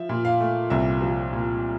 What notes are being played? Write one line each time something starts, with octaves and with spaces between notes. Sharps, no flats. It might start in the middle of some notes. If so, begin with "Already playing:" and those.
Already playing: F3 E5
A#2
F5
A3
C2 E5
F3
A#2